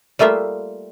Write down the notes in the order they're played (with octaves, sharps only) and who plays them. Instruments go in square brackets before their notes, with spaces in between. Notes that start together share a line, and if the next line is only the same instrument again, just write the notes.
[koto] G3 A3 A#3 F4 E5